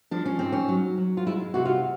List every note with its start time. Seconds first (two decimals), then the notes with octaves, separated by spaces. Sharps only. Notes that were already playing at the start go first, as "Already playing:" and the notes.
0.11 F3 D4
0.25 C#4
0.39 G#2 C4
0.52 C#4
0.69 F#3
0.98 F#3
1.17 F4
1.27 G#3 E4
1.54 C3 F#4
1.65 F4